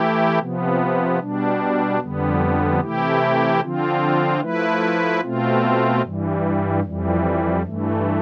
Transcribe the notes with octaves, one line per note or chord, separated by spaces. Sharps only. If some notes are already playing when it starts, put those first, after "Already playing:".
Already playing: E3 A3 E4 G4
C3 F3 B3
B2 G3 D4
F2 D3 G3 B3
C3 E3 A3 E4 G4
D3 F3 C4 F4
F3 A3 E4 B4
B2 A3 C4 F4
G2 E3 G3
F2 E3 G3
G2 E3 A3